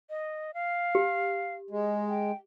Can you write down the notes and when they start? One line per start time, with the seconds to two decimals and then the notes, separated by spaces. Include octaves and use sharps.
0.10 D#5
0.54 F5
0.95 G4
1.70 G#3
2.09 G5